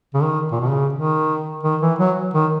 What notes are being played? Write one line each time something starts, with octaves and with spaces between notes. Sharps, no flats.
C#3
D#3
A#2
B2
C#3
D#3
D#3
E3
F#3
D#3